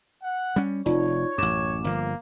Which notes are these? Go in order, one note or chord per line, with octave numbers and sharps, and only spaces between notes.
F#5
G3 C#4
F1 D#4 F4 C#5 D5
A1 F#2 D6 E7
G1 F3 A#3